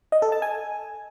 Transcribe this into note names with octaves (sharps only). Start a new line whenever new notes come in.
D#5
A4
A5
G#5